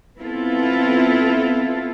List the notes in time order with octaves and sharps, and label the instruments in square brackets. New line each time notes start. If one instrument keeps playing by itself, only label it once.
[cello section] B3 C4 E4 F4 A4